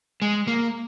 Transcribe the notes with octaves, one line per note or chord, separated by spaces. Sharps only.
G#3
A#3